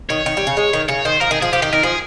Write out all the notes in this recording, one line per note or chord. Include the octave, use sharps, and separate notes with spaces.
D#3 C#5
D#3
G3
C#3
G#3
D#3
C#3 C#5
D#3 C5
F3 A#4
D#3 G#4
F3 G#4
F3 G4
D#3 G4
D#3 A#4
F3 G#4